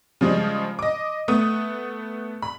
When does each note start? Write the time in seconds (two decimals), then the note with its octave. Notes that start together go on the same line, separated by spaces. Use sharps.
0.21 C#3 F3 G3 G#3
0.79 D#5 D6
1.28 A3 B3 D#6
2.42 B5